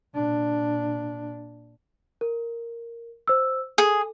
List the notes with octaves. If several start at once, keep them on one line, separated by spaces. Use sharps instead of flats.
A#2 D4
A#4
C5 E6
G#4 A4